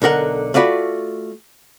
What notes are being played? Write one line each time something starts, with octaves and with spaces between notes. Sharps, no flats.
B1 D3 A#4 F#5
A3 F4 F#4 D5 B5